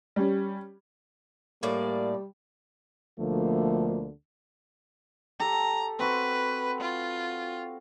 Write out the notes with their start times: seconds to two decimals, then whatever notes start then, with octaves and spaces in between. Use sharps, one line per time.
0.16 G3 C#4
1.63 A2 G3 A#3 D5
3.20 D2 B2 D3 F3 A3 A#3
5.40 G4 A4 A#5
5.99 C4 F#4 B4
6.81 F4